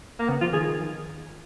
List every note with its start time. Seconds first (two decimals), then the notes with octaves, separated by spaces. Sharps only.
0.19 A#3
0.29 C#3 B3
0.41 F3 F4
0.53 D#3 G#4